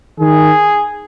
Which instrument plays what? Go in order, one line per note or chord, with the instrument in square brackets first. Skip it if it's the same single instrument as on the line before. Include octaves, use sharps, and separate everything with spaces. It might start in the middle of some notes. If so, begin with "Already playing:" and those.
[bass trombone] D#3 [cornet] G#4